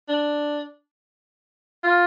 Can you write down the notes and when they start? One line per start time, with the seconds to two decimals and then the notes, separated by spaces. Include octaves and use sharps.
0.08 D4
1.84 F4